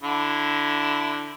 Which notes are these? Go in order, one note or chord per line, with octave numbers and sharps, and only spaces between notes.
D3 E4